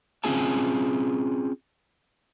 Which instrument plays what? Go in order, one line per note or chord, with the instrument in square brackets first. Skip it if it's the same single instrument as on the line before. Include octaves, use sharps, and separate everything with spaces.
[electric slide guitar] C4 C#4 F4 G#4 G#5 A5